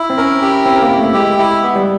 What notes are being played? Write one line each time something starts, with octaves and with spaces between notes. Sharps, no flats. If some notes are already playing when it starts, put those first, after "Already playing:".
Already playing: E4
C4
C#4 A#4
G4
C4 E4
A#3
E4
A3
G#3 G4
E4
B3
G3